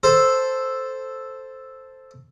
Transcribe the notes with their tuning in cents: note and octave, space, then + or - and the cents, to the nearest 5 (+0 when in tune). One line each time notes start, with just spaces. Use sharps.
A4 +0 C5 +0